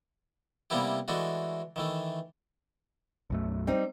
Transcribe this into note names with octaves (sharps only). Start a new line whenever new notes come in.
C3 G3 A#3 B3 E4 G4
E3 G#3 A3 D4 F#4
D#3 E3 A3
B1 F#2 A3
G3 C4 D#4